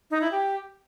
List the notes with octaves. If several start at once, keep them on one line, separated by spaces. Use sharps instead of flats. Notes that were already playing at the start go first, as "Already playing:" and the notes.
D#4
E4
G4